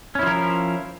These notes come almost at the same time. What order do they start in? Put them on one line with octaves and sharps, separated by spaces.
C#4 E4 F3 A#4